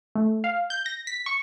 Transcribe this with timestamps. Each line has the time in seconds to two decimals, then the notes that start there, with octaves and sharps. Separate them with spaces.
0.15 A3
0.44 F5
0.70 G6
0.86 A#6
1.07 B6
1.26 C#6